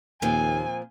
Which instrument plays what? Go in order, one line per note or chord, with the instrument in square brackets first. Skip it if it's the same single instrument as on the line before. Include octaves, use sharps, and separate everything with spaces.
[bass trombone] D#2 [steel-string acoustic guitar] A#2 F3 C4 [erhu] G#5